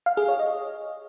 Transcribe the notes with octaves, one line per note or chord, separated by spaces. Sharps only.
F5
G#4
C#5
D#5